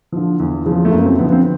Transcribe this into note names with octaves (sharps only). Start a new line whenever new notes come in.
D3 F3
E2
C#3 F3
A3
F#2 A#3
C4
D3 F3 B3
C4